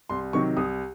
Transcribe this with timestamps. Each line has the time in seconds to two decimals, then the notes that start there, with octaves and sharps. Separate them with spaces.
0.10 C2 C6
0.33 C3 D#3 F#3 C#6
0.57 C2 D#6